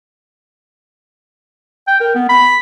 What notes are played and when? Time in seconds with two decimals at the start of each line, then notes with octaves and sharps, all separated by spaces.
1.87 G5
2.01 A#4
2.15 B3
2.29 B5